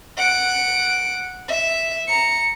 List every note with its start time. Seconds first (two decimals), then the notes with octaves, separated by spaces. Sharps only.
0.17 F#5 D7
1.48 E5
2.08 A#5 C#7